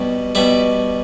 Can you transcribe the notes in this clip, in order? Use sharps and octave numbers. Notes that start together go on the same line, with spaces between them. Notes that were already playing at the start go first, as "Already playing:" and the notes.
Already playing: B2 G3
B2 G3 E5